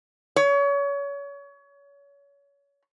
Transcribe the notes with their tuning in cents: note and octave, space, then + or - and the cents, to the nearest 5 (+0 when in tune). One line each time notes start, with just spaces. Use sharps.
C#5 +30